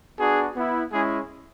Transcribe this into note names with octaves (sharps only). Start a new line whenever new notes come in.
B3 D4 F#4 G#4
B3 E4
G#3 C#4 E4 G#4